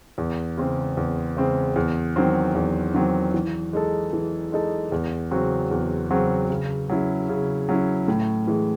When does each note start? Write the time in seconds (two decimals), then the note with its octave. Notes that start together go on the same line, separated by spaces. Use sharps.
0.18 E2
0.58 C#3 G#3 C4
0.97 E2
1.37 C#3 G#3 C4
1.76 E2
2.16 D#3 F#3 C4
2.55 E2
2.95 D#3 F#3 C4
3.34 E3
3.73 G#3 D#4 A4
4.13 E3
4.52 G#3 D#4 A4
4.92 E2
5.31 C#3 F#3 C4 F#4
5.71 E2
6.11 C#3 F#3 C4 F#4
6.50 C#3
6.89 F#3 C#4 E4
7.29 C#3
7.69 F#3 C#4 E4
8.08 A2
8.47 E3 G#3